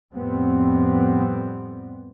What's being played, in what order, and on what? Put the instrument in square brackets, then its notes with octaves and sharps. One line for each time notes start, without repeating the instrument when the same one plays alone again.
[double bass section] F2 A2 G3 B3 C4